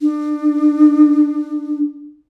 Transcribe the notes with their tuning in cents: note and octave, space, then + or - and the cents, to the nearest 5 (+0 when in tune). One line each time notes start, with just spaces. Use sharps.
D4 +30